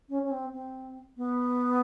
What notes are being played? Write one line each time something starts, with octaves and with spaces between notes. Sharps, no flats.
C#4
C#4
C4
C4
B3